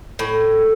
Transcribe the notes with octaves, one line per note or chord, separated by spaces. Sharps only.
A2